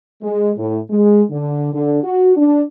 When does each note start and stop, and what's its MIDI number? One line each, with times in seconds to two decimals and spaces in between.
0.22 0.51 56
0.57 0.78 45
0.90 1.22 56
1.30 1.72 50
1.73 1.99 50
2.03 2.34 66
2.37 2.64 62